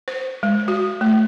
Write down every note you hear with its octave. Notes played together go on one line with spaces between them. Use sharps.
C5
G#3
F#4
A3